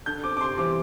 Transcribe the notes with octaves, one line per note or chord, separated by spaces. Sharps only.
D3 G6
C4 D6
D6
C3 C6
E3 G3 C4 D6